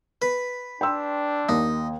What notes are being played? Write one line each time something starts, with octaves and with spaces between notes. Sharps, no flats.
B4
D4 G5 C6 E6
D#2 D#4